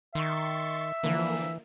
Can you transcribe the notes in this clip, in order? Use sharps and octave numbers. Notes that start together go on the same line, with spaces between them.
D#3 E5 C6 C#6 A6
D3 E3 F3 A#3